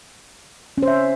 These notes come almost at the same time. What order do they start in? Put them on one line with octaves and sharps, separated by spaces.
C#4 C5 E5